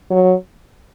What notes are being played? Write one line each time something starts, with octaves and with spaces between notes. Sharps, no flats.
F#3